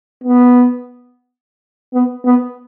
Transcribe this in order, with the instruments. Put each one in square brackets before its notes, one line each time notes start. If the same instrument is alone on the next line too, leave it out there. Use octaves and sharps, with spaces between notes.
[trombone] B3
B3
B3